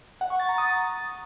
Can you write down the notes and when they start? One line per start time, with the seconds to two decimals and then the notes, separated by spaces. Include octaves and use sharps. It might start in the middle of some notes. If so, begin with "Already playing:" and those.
0.21 F#5
0.30 C#6
0.40 A6
0.49 A#5
0.58 D#6